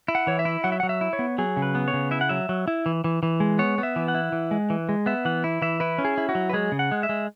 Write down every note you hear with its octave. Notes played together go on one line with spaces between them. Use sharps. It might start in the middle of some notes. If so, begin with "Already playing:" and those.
E4
F#5
E3 C#5
E5
E4
F#3 F#5
E5
F#5
F#3
E5
E4
C#5
B3
F#3 G#4
C#3
B4
B3
C#5
C#3
E4 E5
F#5
F#3 E5
F#3
E4
E3
E3
E3
G#3
B3 C#5
B3
E5
E3
F#5
E4
E3
G#3
E3
G#3
B3 E5
E3 F#5
E4
E3 E5
E4 B4
C#4
G#4
E4
F#4
F#3
B4
G#3 G#4
C#3
F#5
G#3
E5
G#3